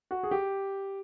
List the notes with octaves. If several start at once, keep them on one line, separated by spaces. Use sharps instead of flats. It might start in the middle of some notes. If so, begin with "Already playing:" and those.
F#4
G#4
G4